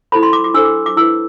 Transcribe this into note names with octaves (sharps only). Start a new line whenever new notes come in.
E4 A4 C5 B5
C6
D6
D6
D4 A4 C5 E6
D6
D6
E4 B4 E6